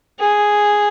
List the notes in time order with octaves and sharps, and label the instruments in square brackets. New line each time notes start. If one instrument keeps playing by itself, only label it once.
[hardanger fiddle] G#4